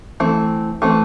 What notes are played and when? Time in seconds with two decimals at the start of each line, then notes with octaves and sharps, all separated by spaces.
0.20 E3 A3 C4
0.82 E3 A3 C4